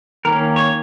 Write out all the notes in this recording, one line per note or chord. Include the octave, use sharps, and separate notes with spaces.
D#3 A#3 C#4 A#4
C#5